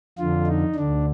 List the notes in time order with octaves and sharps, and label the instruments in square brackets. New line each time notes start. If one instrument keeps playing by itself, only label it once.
[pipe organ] F2 D3 F4
D#4
D2 D3 D4